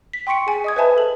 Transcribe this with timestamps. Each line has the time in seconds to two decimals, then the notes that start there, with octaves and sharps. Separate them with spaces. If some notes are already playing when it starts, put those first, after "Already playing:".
0.13 B6
0.27 G5 C6 C#6 B6 C#7 D7
0.47 G#4 G#5
0.64 D#5 D#6 G#6
0.76 B4 C5 E5 G#5 A5 B5
0.97 A4 F#7